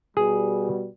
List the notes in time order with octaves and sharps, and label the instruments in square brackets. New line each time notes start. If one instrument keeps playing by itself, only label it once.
[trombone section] B2 G3 [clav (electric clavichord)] G#4